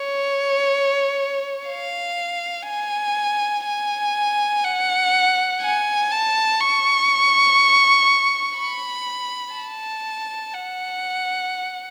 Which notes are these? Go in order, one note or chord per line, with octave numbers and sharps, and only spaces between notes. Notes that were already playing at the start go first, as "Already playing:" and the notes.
Already playing: C#5
F5
G#5
G#5
F#5
G#5
A5
C#6
B5
A5
F#5